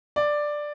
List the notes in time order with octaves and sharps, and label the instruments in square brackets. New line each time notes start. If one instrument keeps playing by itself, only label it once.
[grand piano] D5